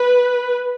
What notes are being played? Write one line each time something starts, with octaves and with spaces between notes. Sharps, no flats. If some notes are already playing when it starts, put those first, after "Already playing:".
Already playing: B4